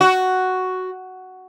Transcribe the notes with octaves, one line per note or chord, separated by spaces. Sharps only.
F#4